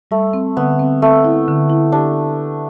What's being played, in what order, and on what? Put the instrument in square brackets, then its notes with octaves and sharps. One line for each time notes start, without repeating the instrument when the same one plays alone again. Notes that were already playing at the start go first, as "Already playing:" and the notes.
[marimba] G3 [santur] A3
[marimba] C4
[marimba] D3 [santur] B3
[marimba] C4
[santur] A3 [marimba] C4
[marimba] E4
D3
E4
[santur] D4 [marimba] G4